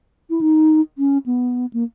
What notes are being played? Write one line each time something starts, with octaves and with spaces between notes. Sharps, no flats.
E4
D#4
C#4
B3
A#3